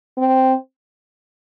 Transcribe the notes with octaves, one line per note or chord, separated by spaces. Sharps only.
C4